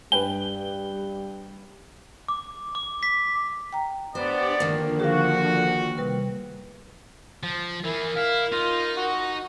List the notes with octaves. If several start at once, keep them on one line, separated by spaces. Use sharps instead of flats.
G2 G3 B4 G5 G7
D6
D6
B6
G5 A#5
B3 D4 G4 C5 D5
D3 D#3 F3 A#3
F#4 G#4 F5
C3 G3 B4
F3
E3 E4 G#4 A#4
E4 F5
D#4 F4
F#4